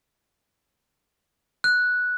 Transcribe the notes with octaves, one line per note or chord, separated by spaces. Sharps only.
F#6